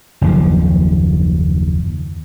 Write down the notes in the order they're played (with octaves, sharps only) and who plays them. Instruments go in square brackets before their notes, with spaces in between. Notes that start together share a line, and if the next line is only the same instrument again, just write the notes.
[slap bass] F#1 D#2 F3